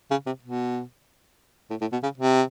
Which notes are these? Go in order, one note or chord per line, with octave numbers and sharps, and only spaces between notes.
C#3
C3
B2
A2
A2
B2
C#3
C3